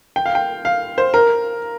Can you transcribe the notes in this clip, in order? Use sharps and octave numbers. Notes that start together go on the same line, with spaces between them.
G5
F5
G5
F5
C5
A#4